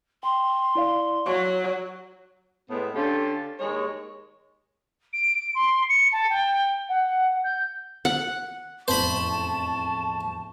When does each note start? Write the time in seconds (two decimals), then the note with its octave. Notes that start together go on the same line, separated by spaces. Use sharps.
0.23 G5 C6
0.75 E4 D5 F5
1.26 F#3 C#6
2.69 A2 G#3 B3
2.94 D3 C#4 F4 G4 A4
3.59 D#2 G#3 C#5
5.13 D7
5.54 C6
5.89 C#7
6.12 A5
6.30 G5
6.89 F#5
7.44 G6
8.05 F#5
8.88 E1 A1 F2 C5 A5 B5 C#6